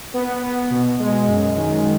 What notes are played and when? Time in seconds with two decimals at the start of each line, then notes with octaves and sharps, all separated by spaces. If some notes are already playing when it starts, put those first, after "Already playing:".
0.14 B3
0.42 B3
0.71 B2
1.00 G#3
1.28 F#2
1.57 D#3